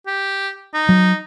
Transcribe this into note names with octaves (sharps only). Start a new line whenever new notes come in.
G4
D#4
F#3